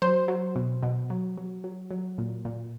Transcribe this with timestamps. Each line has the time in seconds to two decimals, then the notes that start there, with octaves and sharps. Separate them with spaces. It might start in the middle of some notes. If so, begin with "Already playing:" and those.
0.02 F#3 C5
0.28 F#3
0.56 B2
0.83 B2
1.10 F#3
1.38 F#3
1.64 F#3
1.91 F#3
2.18 A#2
2.45 A#2